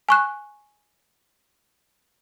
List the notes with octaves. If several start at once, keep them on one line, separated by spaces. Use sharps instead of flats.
G#5 C#6 F#6